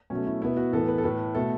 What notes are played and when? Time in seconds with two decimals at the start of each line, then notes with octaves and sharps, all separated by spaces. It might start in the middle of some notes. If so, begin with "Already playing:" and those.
0.10 B2 F#3 A3 C#4
0.26 E4
0.41 B2 B3 E4
0.57 F#4
0.73 A2 E3 B3 A4
0.88 B4
0.98 A4
1.04 A2 A3 B4
1.35 B2 A3 A4